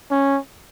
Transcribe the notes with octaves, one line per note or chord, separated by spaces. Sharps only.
C#4